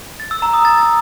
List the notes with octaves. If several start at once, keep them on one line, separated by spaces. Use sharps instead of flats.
A6
E6
A#5
D#6
A6